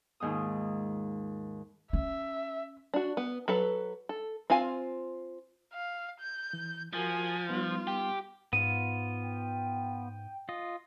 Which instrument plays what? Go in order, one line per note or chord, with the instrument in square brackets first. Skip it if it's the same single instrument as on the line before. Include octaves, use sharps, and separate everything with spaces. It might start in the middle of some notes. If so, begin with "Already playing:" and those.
[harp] D#2 G#2 G#3 F4 D#6
[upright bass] C#4 [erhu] E5
[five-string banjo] D4 F#4
B3
F#3 A4 B4
A4
C4 F4 F5 G#5
[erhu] F5
G6
[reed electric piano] E3
[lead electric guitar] F3 [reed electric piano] F#4 A#4 A6 [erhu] G#5
[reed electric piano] G3 B3 D#4 [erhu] F4
[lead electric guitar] G4
[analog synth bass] G#2 [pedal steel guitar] B3 F4 [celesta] D#7
[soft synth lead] G5
[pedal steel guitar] F4 D#5